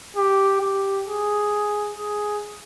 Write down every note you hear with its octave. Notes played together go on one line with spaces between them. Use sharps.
G4
G4
G#4
G#4